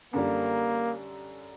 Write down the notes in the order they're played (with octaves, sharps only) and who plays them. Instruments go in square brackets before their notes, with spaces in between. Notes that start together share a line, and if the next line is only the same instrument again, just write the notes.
[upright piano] F#2 D3 G3 [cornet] A#3